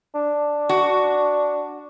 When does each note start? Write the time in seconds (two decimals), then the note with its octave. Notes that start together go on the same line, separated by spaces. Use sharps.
0.15 D4
0.69 F#4